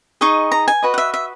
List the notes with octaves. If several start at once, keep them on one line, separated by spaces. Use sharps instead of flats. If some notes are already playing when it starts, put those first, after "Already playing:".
D#4 G#4 D#5 C#6
A#5
G#5
F#4 B4 D#5
F#5
E5
E5